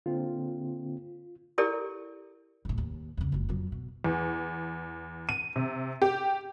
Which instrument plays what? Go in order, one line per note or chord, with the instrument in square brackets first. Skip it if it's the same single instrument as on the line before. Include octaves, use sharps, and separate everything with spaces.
[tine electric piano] D3 A#3 C4 [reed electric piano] F4
[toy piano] E4 G4 A4 A#4 D5
[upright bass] C2 A2
D#2
E2 C#3
F#1 C#2
F2 F#3
B2
[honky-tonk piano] E2
D#7
C3
G4